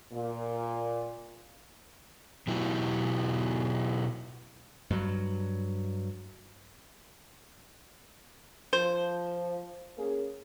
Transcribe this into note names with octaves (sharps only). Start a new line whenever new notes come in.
A#2
B2 F#3 E4 F#4 G4
G2 F#3
F3 C5
A#3 C#4 G#4